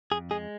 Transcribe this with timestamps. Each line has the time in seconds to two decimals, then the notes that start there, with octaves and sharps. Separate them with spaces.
0.12 F2 G#4
0.31 G#3 G#4